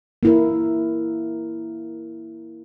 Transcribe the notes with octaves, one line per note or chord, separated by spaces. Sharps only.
A#3 E4 A#4